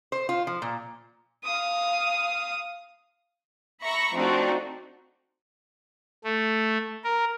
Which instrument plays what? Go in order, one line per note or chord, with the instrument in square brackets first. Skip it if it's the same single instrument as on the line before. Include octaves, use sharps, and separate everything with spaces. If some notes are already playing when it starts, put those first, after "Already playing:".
[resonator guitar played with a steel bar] C5
F4
F3
A#2
[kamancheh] F5 D#6
[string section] E5 A#5 B5 C#6 A#6
F3 A3 C4 D4 D#4 F#4
[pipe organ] A3
A#4